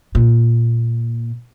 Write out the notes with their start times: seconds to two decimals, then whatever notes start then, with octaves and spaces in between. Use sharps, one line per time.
0.15 A#2